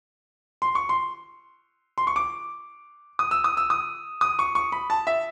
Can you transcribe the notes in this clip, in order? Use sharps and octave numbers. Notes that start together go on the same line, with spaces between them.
C6
C#6
C6
C6
C#6
D6
D#6
E6
D#6
E6
D#6
D#6
C#6
C#6
B5
A5
E5